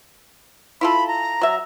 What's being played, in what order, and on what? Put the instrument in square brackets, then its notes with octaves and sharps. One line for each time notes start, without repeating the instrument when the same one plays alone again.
[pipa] E4 F4 A4 [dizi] B5
[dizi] A#5
[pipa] F#3 E5